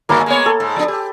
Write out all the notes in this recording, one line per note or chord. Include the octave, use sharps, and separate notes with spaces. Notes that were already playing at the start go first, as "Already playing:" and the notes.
G2 D#3 F#3 A#3 A5 B5
G#3 B3 C#5
A4
G#2
F3 D4
G4